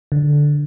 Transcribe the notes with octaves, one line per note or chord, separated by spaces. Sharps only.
D3